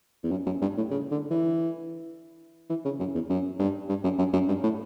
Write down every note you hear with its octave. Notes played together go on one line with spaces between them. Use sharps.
E2
F#2
F#2
G2
A2
C#3
D3
E3
E3
C#3
F#2
E2
F#2
G2
G2
F#2
F#2
F#2
G2
A2